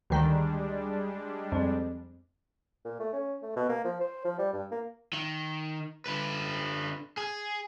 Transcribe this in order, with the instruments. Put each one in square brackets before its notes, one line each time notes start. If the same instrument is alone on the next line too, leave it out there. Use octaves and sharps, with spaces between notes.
[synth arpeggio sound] D2 D#3 [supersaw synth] G3 G#3 D4
[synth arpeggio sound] F2
[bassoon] A#2
A3
C#4
A3
B2
A#3
F3
C5
F3
G3
G2
A#3
[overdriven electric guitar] D#3
D3 B4
G#4